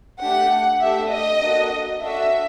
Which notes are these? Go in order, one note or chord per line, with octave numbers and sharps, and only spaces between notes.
A3 D4 G4 F#5
A3 D4 G4 E5
D#5
A#3 D4 F#4 A4
D4 F#4 A4 E5